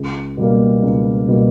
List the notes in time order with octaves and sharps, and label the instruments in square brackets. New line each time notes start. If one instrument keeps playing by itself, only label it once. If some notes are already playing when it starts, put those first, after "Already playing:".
Already playing: [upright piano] C#2
B2 G3 A#3
C#2
B2 G3 A#3